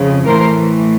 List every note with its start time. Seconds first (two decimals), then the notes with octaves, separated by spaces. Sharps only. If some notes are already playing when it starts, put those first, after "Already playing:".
Already playing: F2 C#3
0.26 A2 E3 A3 A#4 C5